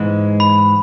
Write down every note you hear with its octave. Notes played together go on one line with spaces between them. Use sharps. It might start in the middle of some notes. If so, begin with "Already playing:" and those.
Already playing: G#2 E3 G#3
B5